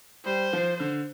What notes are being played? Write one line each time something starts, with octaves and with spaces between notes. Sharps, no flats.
G3 C5
F3
D3